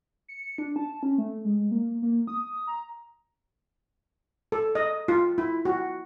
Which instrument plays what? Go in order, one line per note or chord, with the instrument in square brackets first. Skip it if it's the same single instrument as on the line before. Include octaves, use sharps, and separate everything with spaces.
[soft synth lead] C#7
D4
A5
C#4
A3
G#3
A#3
A#3
D#6
A#5
[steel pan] A4
D#5
F4
E4
F#4